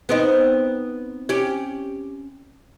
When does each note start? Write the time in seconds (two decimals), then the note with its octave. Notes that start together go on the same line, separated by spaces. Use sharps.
0.09 B3 C4 D#4
1.29 C#4 G4